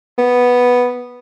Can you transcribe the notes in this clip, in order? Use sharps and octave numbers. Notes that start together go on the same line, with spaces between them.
B3